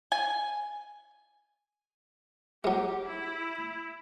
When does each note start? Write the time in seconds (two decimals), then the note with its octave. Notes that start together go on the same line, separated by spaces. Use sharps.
0.12 G#5
2.64 F#3 G#3 G4
3.06 E4